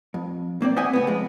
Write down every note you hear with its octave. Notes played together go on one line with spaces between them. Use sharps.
F2
B1 A#3 C4 D5
C5 D#5 E5 F#5 G#5
C#2 A2 B3
F2 G#3